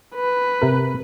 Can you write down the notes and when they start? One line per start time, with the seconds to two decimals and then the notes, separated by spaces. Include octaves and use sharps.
0.16 B4
0.62 C3 A#4